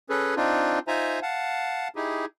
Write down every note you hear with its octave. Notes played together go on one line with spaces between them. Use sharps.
C#4 G#4 A4 B4
C4 D4 D#4 F4
D#4 F4 C5 E5 G#5 A#5
F5 F#5 A5
D#4 E4 G4 G#4